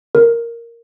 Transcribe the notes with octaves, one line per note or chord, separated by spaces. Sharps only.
A#4